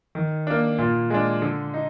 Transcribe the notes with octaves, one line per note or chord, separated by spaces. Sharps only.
D#3
A#3 D4
A#2
G#3 D4
D3
D#4